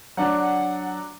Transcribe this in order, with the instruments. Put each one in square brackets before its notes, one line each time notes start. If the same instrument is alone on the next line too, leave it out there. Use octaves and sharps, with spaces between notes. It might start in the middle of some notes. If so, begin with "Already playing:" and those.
[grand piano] F#3 D4 [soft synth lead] F#5